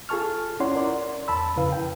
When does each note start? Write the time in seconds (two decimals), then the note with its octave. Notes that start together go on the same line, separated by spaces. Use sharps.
0.09 F4 G#4 A4 A5 C#6 F6
0.60 C#4 E4 C#5 D5 F#5 C6
0.76 A#4 D5 C6
1.28 E2 A5 B5 E6
1.56 F2 C#3 E4 B4 F5
1.72 G5